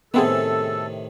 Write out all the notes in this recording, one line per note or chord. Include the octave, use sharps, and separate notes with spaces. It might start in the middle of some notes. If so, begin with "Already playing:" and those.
A2 C3 D#3 B3 C4 G#4 A4